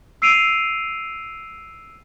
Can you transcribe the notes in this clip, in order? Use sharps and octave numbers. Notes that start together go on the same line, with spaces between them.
E6 C7 D7 D#7 F7